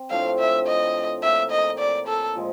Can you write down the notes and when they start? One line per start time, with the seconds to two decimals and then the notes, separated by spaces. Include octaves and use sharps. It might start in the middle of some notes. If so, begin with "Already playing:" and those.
Already playing: C4
0.10 A2 F3 A3 D4 F5
0.39 E5
0.67 D#5
1.23 A2 F3 A#3 E5
1.51 D#5
1.79 D5
2.08 A4
2.35 A#2 F3 G#3